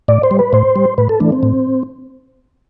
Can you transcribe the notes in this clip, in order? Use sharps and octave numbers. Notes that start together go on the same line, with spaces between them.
A2 D5
C5
G3
B4
A2 C5
G3
A2 B4
A4
E3 A3 D4
C4
A2